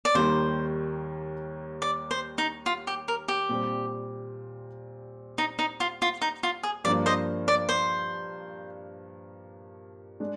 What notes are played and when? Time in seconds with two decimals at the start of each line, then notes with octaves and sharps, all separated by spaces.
0.05 D5
0.15 D#2 D#3 G3 A#3 C5
1.82 D5
2.11 C5
2.38 D#4
2.66 F4
2.87 G4
3.08 A#4
3.28 G4
3.49 A#2 G3 C4
5.38 D#4
5.59 D#4
5.80 F4
6.02 F4
6.22 D#4
6.43 F4
6.63 G#4
6.84 G2 F3 A#3 D4 D5
7.06 C5 D#5
7.48 D5
7.69 C5
10.20 G#3 D4